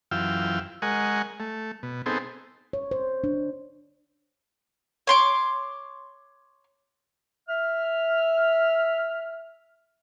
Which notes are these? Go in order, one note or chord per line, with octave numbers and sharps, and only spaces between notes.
F#2 E3 F4 F5 G5 E6
G#3 A#4 D#5 F#5 G#5 C#6
A3
B2
B3 C4 D#4 G#4 A4 C5
C#5
C5
D4
C#5 C6 D6
E5 F6